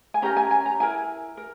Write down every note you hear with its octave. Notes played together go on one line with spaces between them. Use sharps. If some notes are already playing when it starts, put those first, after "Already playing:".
G#5
C#4 G4 A#4 A#5
G#5
G#5
A#5
E4 A#4 G#5
A#4